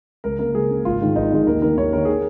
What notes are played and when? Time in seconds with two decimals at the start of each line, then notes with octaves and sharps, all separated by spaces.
0.24 C#2 A#4
0.39 C#3 A#3 A#4
0.55 C#2 G#4
0.71 C#3 A#3
0.85 G#1 F4
1.01 G#2 D#3 G#3
1.16 G#1 D#4
1.32 G#2 D#3 G#3
1.47 D#2 A#4
1.62 D#3 A#3 A#4
1.77 D#2 C#5
1.93 D#3 A#3 A#4
2.05 G#4